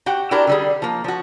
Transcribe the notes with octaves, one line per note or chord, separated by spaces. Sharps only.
F#4 G4 F#5 G5
D4 E4 F#4 G4 A#4 D5
D3 G3 G#4
F3 A#3
F3 F#4